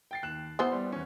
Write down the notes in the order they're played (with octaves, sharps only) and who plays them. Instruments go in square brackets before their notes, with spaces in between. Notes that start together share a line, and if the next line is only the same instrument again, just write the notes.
[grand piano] G5 A6 C7
D#2 F#6 E7
[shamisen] E3 B3 C5 [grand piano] C6
[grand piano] G3
E2 C#4